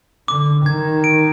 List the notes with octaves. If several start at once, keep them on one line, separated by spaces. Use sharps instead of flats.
D3 D6
D#3 G#6
D7